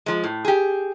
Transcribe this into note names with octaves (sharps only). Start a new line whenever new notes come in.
F3 G#3
A2
G4 G#4